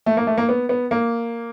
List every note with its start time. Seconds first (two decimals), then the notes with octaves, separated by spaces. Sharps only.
0.06 A3
0.17 A#3
0.27 A3
0.37 A#3
0.49 B3
0.69 B3
0.91 A#3